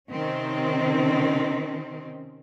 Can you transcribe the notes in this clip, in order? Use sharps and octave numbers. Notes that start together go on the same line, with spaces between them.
C3 D#3 C4 C#4